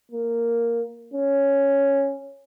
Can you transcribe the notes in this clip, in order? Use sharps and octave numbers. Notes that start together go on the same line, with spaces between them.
A#3
C#4